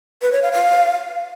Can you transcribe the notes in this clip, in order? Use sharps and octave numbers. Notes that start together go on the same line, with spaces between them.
B4
C#5
F5
F5